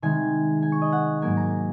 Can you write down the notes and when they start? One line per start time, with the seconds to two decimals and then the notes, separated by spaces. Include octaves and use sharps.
0.02 C3 D#3 G#3 G#5
0.62 G#5
0.72 C#6
0.82 D#5
0.92 F#5
1.22 G#2 F#3 A#3 G#5
1.37 A#5